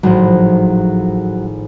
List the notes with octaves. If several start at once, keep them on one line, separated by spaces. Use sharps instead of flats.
G#1 A2 F3 F#3